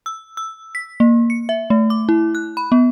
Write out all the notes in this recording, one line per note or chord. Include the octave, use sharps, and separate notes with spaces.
E6
E6
B6
A#3
C#7
E5
A3
D6
E4
F#6
B5
B3